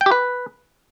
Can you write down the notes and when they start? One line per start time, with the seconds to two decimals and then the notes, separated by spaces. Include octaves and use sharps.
0.01 G5
0.06 G4
0.11 B4